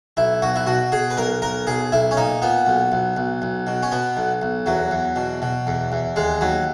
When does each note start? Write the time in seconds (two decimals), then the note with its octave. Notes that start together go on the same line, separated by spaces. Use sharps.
0.17 B1 E4
0.42 B1 F#4
0.56 E4
0.67 B2 F#4
0.92 B2 G#4
1.10 B4
1.17 B1 A#4
1.42 B1 A#4
1.67 B1 G#4
1.92 B1 E4
2.11 C#4
2.17 A#2 D#4
2.42 A#2 B3
2.67 B1
2.92 B1
3.17 B1
3.42 B1
3.67 B2
3.83 C#4
3.92 B2 B3
4.17 B1
4.42 B1
4.66 E2 F#3
4.91 E2
5.16 B2
5.42 B2
5.67 E2
5.92 E2
6.16 D#2 G#3
6.41 D#2 F#3